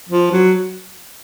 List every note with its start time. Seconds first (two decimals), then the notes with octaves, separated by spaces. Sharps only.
0.10 F3
0.32 F#3